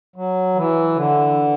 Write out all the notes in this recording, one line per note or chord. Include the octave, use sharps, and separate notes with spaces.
F#3
E3
D3